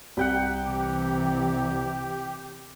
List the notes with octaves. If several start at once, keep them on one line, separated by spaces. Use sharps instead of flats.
C2 F#5 G5 B5
C3 E3 G4